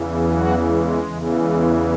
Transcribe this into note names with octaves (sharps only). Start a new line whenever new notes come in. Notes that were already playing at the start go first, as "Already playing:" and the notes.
Already playing: E2 C#3 E3
F#3 F#4
G#3
E2 C#3 E3
G#3